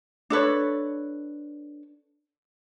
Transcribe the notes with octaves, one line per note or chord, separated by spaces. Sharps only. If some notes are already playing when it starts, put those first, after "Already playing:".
D4 A4 B4 C#5